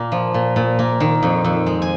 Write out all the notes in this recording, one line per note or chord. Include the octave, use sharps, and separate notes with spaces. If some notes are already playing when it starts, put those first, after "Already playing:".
Already playing: A#2 A#3
F3
A#2
A#2
A#3
D#3
F2
F2
G#3
G#5